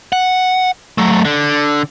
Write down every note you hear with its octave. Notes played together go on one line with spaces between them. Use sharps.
F#5
F#3 A3
D3